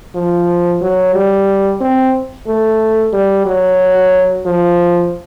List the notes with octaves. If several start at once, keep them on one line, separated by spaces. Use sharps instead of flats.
F3
F#3
G3
C4
A3
G3
F#3
F3